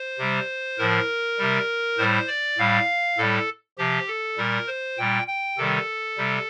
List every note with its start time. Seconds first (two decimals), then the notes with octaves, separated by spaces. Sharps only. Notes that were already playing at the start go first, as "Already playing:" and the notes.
Already playing: C5
0.19 C3 G3
0.78 A2 F3 A#4
1.38 C3 G3
1.98 A2 G3 C5
2.28 D5
2.58 A2 G3 F5
3.18 A2 G3 A4
3.78 C3 F3 G4
4.08 A4
4.38 A#2 G3 A#4
4.67 C5
4.98 A#2 G3 G5
5.28 G5
5.58 C3 D#3 G3 A4
6.18 C3 G3